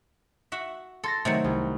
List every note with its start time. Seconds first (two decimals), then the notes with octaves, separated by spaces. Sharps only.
0.52 F#4 E5
1.04 A4 C6 A6 A#6
1.25 C3 D#3 F#3 A3
1.44 C2